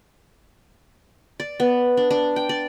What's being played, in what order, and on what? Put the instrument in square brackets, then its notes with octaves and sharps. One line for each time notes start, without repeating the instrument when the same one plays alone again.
[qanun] D5
B3
D4
D4
G5
D5